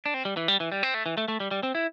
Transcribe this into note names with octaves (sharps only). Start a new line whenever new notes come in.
D4
C4
G3
E3
G3
E3
G3
C4
A3
E3
A3
A3
G3
G3
C4
E4